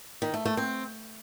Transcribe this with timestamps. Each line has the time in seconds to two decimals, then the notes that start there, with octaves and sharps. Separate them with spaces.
0.22 D#3
0.34 A3
0.45 A3
0.57 C4